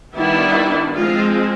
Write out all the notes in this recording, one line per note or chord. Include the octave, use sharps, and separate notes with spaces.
D#3 G3 B3 D4 E4
F3 G#3 C4 F4